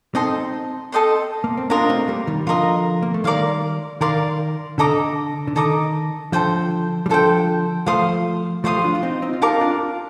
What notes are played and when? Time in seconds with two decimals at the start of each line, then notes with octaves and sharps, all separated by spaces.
0.15 C4 D#4 A4 D#5 G5 C6
0.92 A4 D#5 G5 C6
1.44 A#3
1.57 C4
1.70 A#3 D4 F4 A#4 D#5 A#5
1.81 D4
1.89 A3 C4
2.08 G3 A#3
2.27 D#3 G3
2.47 D3 F3 F4 A#4 D#5 A#5
3.02 A#3
3.14 A3
3.24 D#3 G3 A#4 D5 F5 C6
4.01 D#3 A#4 D5 F5 C6
4.78 D3 A4 D#5 A#5 D6
5.47 D3
5.55 D#3 A4 D#5 A#5 D6
6.32 D3 F3 A4 C5 G5
7.06 G3
7.09 D3 F3 A4 C5 G5
7.86 F3 A3 C5 F5 C6 D#6
8.64 F3 A3 C5 F5 C6 D#6
8.77 G4
8.84 D4 F4
8.95 F4
9.03 C4 D#4
9.22 C4 D#4
9.33 F4
9.42 D#4 G4 A#4 F5 A5 D6
9.61 D4 F4